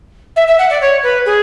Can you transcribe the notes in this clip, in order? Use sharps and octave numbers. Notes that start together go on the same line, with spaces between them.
E5
E5
F#5
D5
C#5
B4
G#4